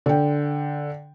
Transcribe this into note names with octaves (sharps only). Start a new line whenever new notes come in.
D3 G5